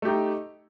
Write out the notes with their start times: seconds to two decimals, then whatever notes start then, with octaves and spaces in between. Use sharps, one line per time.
0.02 A3
0.05 G4
0.08 D#4